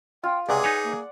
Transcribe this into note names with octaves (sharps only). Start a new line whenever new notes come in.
F4 G5
C#2 C3 G#4 D5 F#5 G#5
D#4 B4 C#5
A#3